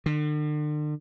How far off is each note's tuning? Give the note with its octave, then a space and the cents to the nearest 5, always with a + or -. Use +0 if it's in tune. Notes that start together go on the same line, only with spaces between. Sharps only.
D3 +40